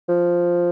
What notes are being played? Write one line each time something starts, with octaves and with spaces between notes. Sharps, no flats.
F3